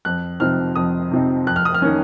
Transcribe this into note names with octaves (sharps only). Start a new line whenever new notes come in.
F2 F#6
C3 F3 C4 D#4 F6
F2 D#6
C3 F3 C4 D#4
F2 F#6
F6
D#6
F6
D#3 A#3 C#4